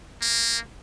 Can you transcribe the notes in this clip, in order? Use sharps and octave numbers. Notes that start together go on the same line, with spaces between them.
A#3